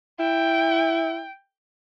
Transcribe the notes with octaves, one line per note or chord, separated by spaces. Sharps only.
E4 G5